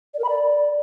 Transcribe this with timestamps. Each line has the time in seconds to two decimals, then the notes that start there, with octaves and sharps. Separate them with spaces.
0.14 D5
0.19 A#4
0.24 B5
0.29 D5